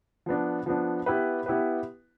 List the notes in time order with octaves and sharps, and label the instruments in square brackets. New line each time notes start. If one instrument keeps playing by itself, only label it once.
[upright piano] F3 B3 D4
F3 B3 D4
B3 E4 G4 B4
B3 E4 G4 B4